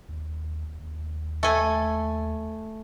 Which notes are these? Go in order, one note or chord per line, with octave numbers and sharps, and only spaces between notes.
D#2
D#2
A3 G#5